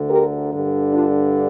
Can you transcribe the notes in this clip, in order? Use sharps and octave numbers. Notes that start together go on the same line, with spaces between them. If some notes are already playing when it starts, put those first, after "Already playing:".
Already playing: D2 D3
G4 A#4
G2 D3
D4 F4